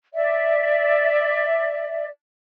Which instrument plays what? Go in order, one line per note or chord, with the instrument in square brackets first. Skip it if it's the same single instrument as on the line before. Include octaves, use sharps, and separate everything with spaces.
[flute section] D5 E5